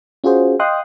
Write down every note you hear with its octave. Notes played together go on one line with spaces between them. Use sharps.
C#4 F4 F#4 G#4 C5
D#5 F5 G5 C6 D#6 F#6